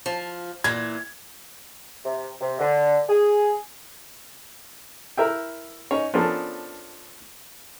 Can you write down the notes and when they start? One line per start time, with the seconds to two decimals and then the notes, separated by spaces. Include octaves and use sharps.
0.06 F3
0.64 A#2 E3 G#6
2.04 C3
2.41 C3
2.59 D3
3.09 G#4
5.17 E4 A#4 E5 G5
5.91 C#4 D#4 C#5
6.14 F3 B3 C#4 D4 A4 A#4